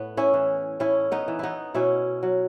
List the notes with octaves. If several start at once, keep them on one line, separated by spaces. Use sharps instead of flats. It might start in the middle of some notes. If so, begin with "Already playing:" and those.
Already playing: A2 B3
C#4 E4
E3
A2 C#4 E4
B3 D#4
E3
B3 D#4 E4
B2 C#4 E4
F#3